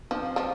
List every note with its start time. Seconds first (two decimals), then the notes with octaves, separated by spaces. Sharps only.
0.11 F3 C4
0.36 F3